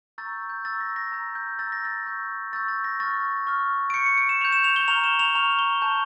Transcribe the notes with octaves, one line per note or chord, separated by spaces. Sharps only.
A#5 C#6 E6 G6 A6
G6
A#5 C#6 E6 G6 A6
A#6
A#6
A#5 E6 G6
G6
A#5 E6 G6 A6
A#6
A6
C#6 E6 G6
C#6 E6 G6 A6
A6
A#6
C#6 F6 A6
C#6 F6
D7
C#6 G6 C#7
C#7
D7
E7
C#6 G6 F7
E7
F7
G7
A#5 C#6 F6 F7
E7
F7
A#5 C#6 F6 F7
G7
A5 C#6 G6